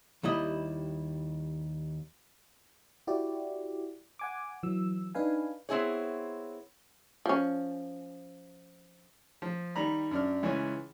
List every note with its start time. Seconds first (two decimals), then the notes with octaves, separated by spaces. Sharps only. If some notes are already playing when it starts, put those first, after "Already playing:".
0.23 D#2 G3 E4 D#5
3.07 E4 F#4 G4 D5
4.19 F#5 G#5 D6
4.63 E3 F#3 E6
5.15 D4 D#4 B4 F5 G#5
5.69 B3 C4 E4 G#4 C#5
7.26 F3 C#4
9.42 F3
9.76 D#3 G3 A#5 B5
10.11 F#2 D4 F6
10.43 C#2 E3 C#4 G#5